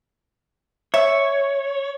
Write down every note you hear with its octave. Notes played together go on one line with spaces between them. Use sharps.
C#5 E5